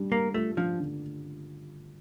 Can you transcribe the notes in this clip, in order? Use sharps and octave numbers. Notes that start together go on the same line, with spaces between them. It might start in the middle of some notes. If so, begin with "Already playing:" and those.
Already playing: G3 D4
G3 A#3
A3 F4
F3 D4
D3